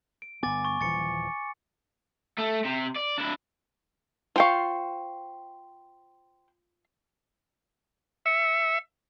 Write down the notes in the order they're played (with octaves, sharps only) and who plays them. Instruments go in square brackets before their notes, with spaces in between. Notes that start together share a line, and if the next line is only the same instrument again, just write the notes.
[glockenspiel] D7
[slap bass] G1 B3 [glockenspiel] G#5 D6 A6
[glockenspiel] C#6 A6
[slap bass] D#1 E3 F3 [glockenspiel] A6 C#7
[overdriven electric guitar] A3
C3
D5
D4 E4
[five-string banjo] F4 F5 [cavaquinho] C5 G5 C#6
[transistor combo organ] E5 [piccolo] C#7